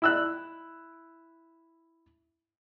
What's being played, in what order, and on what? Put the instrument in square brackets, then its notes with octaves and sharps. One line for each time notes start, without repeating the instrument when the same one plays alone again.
[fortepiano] E4 E6 F#6